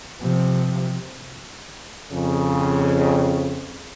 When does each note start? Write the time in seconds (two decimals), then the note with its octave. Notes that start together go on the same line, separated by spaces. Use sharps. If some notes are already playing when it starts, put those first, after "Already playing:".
0.20 C3 F3
2.13 F2 C#3